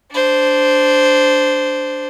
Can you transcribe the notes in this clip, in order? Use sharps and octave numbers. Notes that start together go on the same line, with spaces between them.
D4 C5